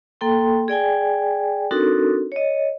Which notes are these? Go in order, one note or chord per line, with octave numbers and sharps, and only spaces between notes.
A#3 A4 G5 C6
G#4 D5 G5 G#5
C4 D4 D#4 F#4 A4 A#4
C#5 D#5